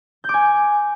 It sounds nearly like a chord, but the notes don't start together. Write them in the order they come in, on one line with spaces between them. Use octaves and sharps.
G6 D6 G#5